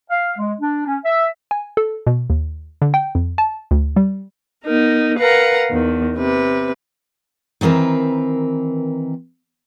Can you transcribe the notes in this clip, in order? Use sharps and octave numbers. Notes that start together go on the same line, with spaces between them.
F5
G#3
D4
C#4
E5
G#5
A4
B2
D#2
D3
G5
F2
A5
D2
G3
B3 D#4 A#4
A#4 B4 F5 F#5 A#5
E2 D#3
C3 B4
D#3 E3 C4 A#4 B4